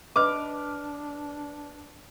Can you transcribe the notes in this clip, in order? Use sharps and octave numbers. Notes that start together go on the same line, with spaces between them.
D4 B4 D#5 D6 F6